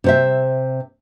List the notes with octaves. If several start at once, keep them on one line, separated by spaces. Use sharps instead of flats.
C3 C5 E5